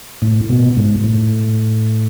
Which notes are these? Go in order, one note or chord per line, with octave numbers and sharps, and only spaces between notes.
A2
B2
G#2
A2